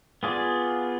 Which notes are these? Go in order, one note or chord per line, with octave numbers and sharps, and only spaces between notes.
B3 F4 G#4 D5